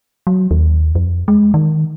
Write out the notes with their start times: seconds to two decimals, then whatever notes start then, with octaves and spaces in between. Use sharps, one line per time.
0.27 F#3
0.51 D#2
0.95 F2
1.28 G#3
1.54 D#3